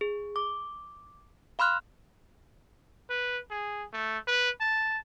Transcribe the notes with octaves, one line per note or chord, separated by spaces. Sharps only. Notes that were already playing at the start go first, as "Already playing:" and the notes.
G#4
D6
F5 B5 C6 F6 F#6
B4
G#4
A3
B4
A5